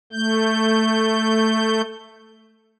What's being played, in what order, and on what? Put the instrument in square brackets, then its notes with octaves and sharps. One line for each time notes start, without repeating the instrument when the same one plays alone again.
[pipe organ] A3 G6